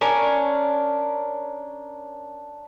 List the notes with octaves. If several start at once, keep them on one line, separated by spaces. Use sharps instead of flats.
C#4 D4 A#4